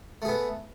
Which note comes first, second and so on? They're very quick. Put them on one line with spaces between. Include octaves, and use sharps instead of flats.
A3 G#4 B3